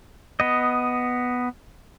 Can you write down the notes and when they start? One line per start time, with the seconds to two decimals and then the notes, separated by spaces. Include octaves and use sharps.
0.40 B3 D#5